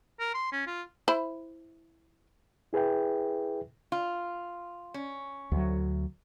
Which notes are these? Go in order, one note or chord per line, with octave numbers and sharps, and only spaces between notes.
A#4
C6
C#4
F4
E4 C5 B5
E4 G#4 B4 E5 G5
F4
C#4
D2 F#3